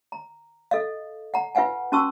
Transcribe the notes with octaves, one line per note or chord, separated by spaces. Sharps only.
A#5
A4 D#5 F5
F#5 A#5
F4 B4 F5 F#5 G#5
C#4 F#4 A5 C#6 E6